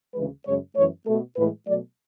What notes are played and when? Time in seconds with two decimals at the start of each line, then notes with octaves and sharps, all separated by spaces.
0.14 D2 C#3 E3 G#3 B4
0.45 F#2 C#3 G#3 C#5
0.75 F#2 E3 A3 C#5
1.06 A3 A4
1.10 B2
1.36 A2 E3 G#3 B4
1.67 B2 F#3 A3 D5